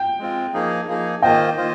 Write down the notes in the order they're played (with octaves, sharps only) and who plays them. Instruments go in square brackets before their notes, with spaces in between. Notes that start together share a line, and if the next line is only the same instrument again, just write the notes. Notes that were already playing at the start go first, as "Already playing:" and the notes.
Already playing: [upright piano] G5
[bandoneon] G#3 C4 F4
F3 A#3 D#4 G#4
F3 A#3 D#4 G#4
[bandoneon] D#3 A#3 F4 C5 D#5 [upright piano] G5
[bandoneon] D#3 A#3 F4 C5 D#5